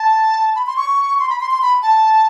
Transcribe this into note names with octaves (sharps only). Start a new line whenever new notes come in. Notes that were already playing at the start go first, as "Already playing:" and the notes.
Already playing: A5
B5
C6
C#6
C6
B5
C6
C6
B5
A5